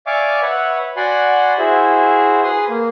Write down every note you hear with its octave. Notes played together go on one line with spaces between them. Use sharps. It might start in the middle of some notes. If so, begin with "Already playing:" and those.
D5 E5 F5 G#5 C#6 D6
B4 C#5 E5 F#5
F#4 D5 F#5 G#5 B5 C6
E4 F#4 G#4 C5 E5
G#4 B4 C6 D#6
A#3